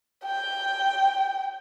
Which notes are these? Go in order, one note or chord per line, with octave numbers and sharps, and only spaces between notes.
G5